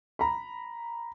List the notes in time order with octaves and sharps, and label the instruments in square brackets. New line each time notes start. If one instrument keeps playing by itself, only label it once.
[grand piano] A#5 B5